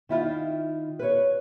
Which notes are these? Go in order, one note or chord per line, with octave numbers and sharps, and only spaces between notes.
D#3 E4 F4
B4 C#5